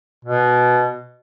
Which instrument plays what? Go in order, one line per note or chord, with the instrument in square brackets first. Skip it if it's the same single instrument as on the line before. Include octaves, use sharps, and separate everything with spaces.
[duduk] B2